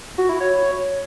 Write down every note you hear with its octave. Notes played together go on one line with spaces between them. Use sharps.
F#4
E4
C#5